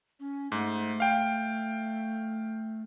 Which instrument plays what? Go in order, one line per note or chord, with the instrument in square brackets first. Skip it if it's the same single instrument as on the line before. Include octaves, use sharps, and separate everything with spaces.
[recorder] C#4
[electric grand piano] G#2 [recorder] A3
[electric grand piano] F5 G5